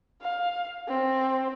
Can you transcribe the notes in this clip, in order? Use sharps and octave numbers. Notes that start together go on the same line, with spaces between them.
F5
C4